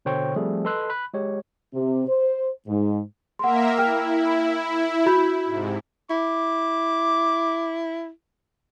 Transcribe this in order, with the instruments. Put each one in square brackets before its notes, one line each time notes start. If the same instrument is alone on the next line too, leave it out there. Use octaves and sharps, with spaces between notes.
[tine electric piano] B2 D3 C5 C#5 G5 C#6
F3 G3 A3 C4 G#4 A4
A4 B4 D#5 C6 E6 F#6
B5 F#6
G#3 G4 C#5
[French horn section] C3
C5
G#2
[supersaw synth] A#3 A#4 E5 [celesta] F#5 C6
[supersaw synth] E4 [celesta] G5 F6
[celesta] F#4 B5 G6
[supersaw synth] G#2 C3
[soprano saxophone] E4 [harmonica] D6